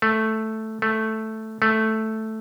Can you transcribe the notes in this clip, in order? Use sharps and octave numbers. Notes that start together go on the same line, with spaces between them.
A3
A3
A3